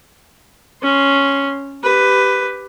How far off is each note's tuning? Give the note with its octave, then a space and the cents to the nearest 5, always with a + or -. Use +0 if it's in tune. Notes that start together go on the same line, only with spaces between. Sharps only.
C#4 +0 C6 +0
G4 +0 B4 +10